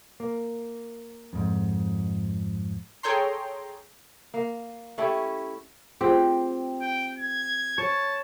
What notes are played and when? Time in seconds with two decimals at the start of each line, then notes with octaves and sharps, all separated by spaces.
0.20 A#3
1.33 F2 G#2
3.03 G#4 A4 C#5 G5 A#5 C6
4.34 A#3
4.98 A3 C#4 E4 G4
6.01 A3 C4 F4 G4 G#4
6.81 G5
7.19 G#6
7.78 C#5 A5